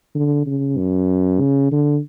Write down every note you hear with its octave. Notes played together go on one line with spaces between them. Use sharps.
D3
C#3
F#2
C#3
D3